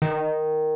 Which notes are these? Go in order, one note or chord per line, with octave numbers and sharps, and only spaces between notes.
D#3